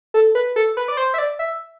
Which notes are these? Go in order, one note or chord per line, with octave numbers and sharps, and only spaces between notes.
A4
B4
A4
B4
D5
C5
E5
D5
E5